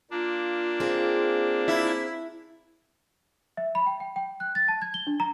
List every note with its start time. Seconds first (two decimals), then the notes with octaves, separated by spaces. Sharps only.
0.11 A#3 D4 F4
0.80 C4 G#4
1.68 E4
3.57 E5
3.75 B5
3.86 G5
4.00 G5
4.16 G5
4.40 F#6
4.55 A6
4.68 A5
4.82 G#6
4.94 G7
5.07 D4
5.20 A#5